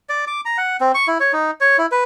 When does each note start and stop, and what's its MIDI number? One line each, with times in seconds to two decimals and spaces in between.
0.09 0.25 74
0.27 0.41 86
0.45 0.57 82
0.58 0.77 78
0.80 0.92 60
0.94 1.07 85
1.08 1.18 64
1.20 1.32 73
1.33 1.51 63
1.61 1.77 73
1.78 1.86 64
1.91 2.04 71